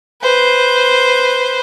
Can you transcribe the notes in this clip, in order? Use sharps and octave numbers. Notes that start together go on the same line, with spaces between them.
B4 C5